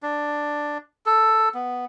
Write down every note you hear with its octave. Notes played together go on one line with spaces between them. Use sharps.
D4
A4
B3